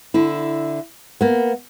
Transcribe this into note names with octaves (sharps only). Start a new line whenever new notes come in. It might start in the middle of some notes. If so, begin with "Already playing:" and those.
D3 E4
A#3 B3